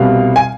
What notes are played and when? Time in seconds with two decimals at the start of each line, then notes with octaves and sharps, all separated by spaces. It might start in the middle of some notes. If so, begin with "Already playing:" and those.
Already playing: C2 B2 G3 F5
0.36 G#5